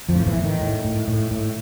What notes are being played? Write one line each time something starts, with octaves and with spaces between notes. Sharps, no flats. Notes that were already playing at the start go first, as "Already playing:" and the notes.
F2 F3
A2
E2 E3
A2
D#3
A2
A2
A2
A2